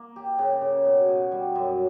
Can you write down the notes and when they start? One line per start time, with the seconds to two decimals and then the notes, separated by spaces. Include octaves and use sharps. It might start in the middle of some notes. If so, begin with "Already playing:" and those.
Already playing: A#3
0.16 G4
0.39 C#3
0.61 C#3
0.85 B2
1.08 B2
1.32 G3
1.55 F#2